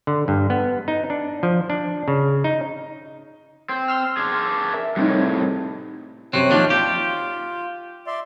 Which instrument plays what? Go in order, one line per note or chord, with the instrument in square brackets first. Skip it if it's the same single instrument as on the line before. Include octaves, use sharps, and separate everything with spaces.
[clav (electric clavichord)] D3
G2
B3
D#4
D4
F3
D4
C#3
D#4
[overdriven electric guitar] C4
[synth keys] C6 E6 F6
[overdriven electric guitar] D4 G#4
[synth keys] A#4 E5
[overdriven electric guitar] C2 A2 [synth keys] G3 C4 D#4
[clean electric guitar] F#2 C3 C4 [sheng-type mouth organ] C#5 F#6
[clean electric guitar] D#2 F3 D4
[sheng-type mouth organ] F4 [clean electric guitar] G4
[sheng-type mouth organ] D5 E5 C6